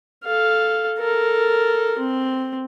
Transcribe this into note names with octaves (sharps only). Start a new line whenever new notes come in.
A4 F5
A4 A#4
C4